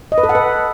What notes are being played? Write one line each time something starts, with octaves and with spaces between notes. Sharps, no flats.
D#5
B4
A4
F#5
B4